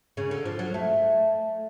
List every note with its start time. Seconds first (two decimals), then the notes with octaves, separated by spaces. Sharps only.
0.17 C#3
0.31 D3
0.45 F3
0.59 F#3
0.74 A3